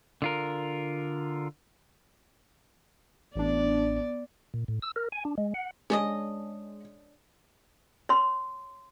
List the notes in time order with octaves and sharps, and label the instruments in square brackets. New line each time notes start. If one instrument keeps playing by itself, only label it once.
[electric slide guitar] D3 F4 A#4
[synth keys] A1 D4 [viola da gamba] B3 D5
[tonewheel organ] A#2
A2
E6
A#4
G#5
D4
G#3
F#5
[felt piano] G#3 [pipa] C#4 D4 D#5
[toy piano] C#5 C6